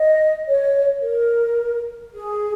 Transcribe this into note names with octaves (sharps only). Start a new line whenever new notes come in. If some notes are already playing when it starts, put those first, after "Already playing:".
Already playing: D#5
C#5
A#4
G#4